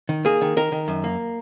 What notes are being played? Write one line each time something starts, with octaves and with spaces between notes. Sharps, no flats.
D#3
A#3 G#4
D#3
D#3 A#4
D#3
F#2
A#3